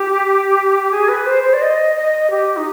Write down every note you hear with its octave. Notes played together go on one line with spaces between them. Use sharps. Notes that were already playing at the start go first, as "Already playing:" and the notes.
Already playing: G4
G#4
B4
C5
C5
D5
D#5
D#5
G4
D#4